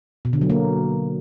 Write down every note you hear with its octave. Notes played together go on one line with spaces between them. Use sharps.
B2
D3
F#3
A#3